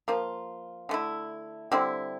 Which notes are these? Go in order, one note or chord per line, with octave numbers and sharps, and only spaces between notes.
F3 A#3 F4
D3 A3 E4
D3 G3 C4 E4